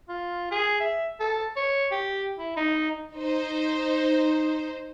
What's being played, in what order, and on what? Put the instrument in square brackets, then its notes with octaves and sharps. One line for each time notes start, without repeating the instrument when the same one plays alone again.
[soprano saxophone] F4
G#4
E5
A4
C#5
G4
E4
D#4
[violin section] D#4 C5